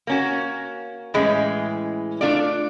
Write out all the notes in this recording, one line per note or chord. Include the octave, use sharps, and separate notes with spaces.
A#3 C#4 F#4
A2 E3 G#3 C#4
A3 D4 F4 A4 D5